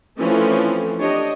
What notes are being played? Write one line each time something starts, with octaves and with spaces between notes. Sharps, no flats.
E3 F3 A3 C4 C#4 A4
D4 G4 C#5 D#5